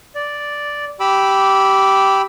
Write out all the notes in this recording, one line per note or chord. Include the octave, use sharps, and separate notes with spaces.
D5
G4 B5 D6 E6